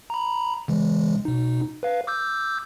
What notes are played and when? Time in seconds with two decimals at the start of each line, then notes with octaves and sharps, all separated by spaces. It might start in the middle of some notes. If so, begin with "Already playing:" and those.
0.10 A#5 B5
0.68 C#3 E3 G#3
1.25 B2 D#4
1.83 B4 F5
2.07 D6 E6 G6